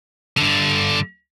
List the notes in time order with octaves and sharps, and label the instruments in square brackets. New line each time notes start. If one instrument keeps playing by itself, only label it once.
[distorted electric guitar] G2 D3